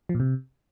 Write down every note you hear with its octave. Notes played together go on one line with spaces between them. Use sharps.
F3
A#2
C3